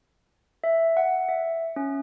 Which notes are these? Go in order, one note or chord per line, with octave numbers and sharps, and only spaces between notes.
E5
F#5
E5
C#4